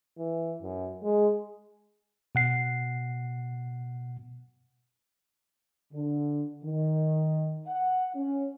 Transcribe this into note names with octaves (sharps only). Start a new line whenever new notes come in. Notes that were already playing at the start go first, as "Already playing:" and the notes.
E3
F#2
G#3
B2 F#5 C7
D3
D#3
F#5
C#4